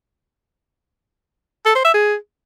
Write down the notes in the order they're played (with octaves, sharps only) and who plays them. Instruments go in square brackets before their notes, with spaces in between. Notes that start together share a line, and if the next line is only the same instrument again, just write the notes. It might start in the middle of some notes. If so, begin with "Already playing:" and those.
[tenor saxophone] A4
C5
E5
G#4